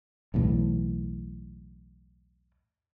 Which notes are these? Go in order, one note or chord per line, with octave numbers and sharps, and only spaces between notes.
B1 E2 A2